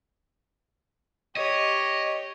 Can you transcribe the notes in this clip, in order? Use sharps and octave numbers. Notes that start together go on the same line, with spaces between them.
G4 C#5 D#5